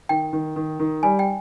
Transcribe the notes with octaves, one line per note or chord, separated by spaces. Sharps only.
D#3 G5
D#3
D#3
D#3
G3 G#5
G5